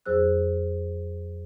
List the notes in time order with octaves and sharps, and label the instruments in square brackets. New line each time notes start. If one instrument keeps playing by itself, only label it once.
[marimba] F2 F#3 G#4 C5 E6 F#6